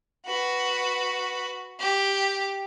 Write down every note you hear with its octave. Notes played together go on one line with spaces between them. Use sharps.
F#4 B4
G4